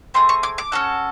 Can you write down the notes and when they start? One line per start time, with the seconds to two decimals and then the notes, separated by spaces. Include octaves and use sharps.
0.14 A3 C4 G#4 C6
0.29 C#6
0.43 D6
0.58 D6
0.72 C#4 F#4 A4